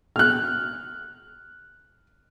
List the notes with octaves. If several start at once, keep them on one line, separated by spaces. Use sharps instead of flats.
F6 F#6